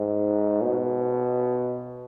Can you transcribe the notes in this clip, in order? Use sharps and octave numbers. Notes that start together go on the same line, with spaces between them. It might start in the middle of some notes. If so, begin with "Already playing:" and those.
Already playing: G#2
B2